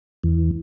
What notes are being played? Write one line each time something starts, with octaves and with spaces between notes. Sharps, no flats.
E2